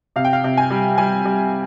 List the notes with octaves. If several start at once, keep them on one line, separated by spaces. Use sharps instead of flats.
C3 F5
G5
F5
C3
G#5
G3
G3 G#5
G3